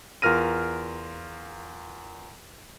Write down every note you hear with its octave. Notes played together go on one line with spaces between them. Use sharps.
E2 F4 A#4 F6 A#6 D#7